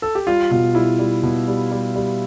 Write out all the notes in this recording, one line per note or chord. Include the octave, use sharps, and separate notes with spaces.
A4
G4
G3 F4
B2 F4
G3 E4
G3
B2
G3
G3
G3